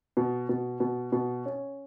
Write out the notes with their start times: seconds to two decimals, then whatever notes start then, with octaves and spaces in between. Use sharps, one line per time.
0.17 B2
0.49 B2
0.80 B2
1.12 B2
1.46 C#4